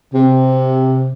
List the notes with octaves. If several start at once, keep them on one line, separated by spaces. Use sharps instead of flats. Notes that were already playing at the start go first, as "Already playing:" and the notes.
C3